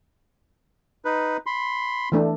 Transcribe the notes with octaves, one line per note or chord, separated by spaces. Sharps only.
D#4 B4
B5 C6
E3 A3 D4